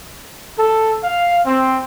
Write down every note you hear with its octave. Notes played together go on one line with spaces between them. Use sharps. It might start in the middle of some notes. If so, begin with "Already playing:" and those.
A4
F5
C4